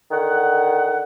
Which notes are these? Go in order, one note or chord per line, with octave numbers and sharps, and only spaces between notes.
D3 D#3 F#5